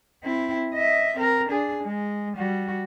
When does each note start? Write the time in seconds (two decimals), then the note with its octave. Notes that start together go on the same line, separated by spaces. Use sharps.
0.23 C4 E4
0.74 D#5 E5
1.17 C4 A#4
1.49 D4 G#4
1.84 G#3
2.37 G3 F#4